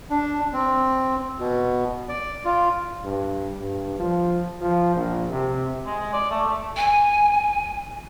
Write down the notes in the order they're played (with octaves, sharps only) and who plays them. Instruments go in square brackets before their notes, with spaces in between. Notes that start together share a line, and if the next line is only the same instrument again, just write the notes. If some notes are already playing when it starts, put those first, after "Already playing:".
[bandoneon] D4
C4
B2
D5
F4
[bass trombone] G2
G2
F3
F3
A#1
C3
[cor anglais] G#3
D5
A3
A3
[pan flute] G#5